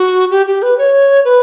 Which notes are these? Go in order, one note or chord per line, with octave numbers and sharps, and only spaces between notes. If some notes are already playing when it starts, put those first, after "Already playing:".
Already playing: F#4
G4
G4
B4
C#5
B4